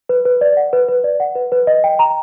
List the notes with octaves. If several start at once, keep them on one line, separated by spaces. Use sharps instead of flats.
B4
B4
D5
F#5
B4
B4
D5
F#5
B4
B4
D#5
G5
A#5